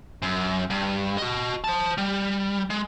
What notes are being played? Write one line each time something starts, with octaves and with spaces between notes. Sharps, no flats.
F#2
G2
F#4 D#5
C5 A5
G3
G#3